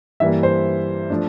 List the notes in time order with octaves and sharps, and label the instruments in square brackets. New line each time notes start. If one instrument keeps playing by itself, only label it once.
[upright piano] G2 E3 G3 A#3 E5
C5
F3 A3 D4